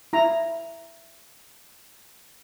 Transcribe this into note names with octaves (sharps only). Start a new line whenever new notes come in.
E4 A#5